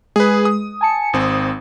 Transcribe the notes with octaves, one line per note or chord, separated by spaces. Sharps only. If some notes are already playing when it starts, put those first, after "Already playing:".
G#3 G#4 B4
D#6
G#5 A5 C#7
G#1 C4 D#6